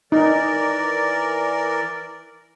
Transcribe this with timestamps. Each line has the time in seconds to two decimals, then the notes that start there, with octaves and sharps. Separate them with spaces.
0.12 E3 D#4 A#4 D5